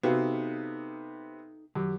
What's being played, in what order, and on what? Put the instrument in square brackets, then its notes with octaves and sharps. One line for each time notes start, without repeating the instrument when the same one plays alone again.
[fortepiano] C3 B3 [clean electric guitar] D#4 A4 F5 [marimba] F#4
[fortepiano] F#2 [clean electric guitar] D#3 G4